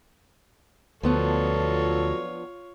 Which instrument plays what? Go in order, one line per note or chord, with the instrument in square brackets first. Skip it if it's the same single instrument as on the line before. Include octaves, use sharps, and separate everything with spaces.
[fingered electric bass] D2 [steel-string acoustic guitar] F3 B3 D4 [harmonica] F#3 A4 [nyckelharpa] F4 C#5